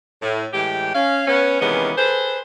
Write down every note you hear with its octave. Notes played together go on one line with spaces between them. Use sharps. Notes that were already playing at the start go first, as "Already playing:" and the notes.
A2
A2 E3 G#3 G4
C#4 F5
B3 C#4
C3 D#3 E3 G#3 B3 C#4
G#4 A4 B4 C5